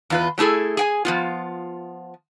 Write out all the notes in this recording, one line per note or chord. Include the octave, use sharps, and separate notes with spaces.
E2 F4 B4
F#3 A3 E4 G#4 A4
G#4 G5 G#5
F3 B3 F4